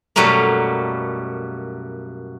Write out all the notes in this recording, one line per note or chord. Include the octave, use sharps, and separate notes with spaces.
F#2 B2 F#3 G3 A3 A#3